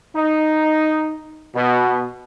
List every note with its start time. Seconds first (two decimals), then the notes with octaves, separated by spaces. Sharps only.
0.16 D#4
1.55 B2